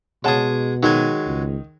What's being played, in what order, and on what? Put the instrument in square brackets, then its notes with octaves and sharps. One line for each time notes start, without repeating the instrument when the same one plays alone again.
[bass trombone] B2 [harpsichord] G#3 G#4 [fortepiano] C#5 F#5 A5
[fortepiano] D#3 D#4 [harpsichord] F#3 G#3 G#5
[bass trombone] C#2